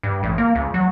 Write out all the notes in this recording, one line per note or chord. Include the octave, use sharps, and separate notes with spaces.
G2
A1
A#3
C#2
F#3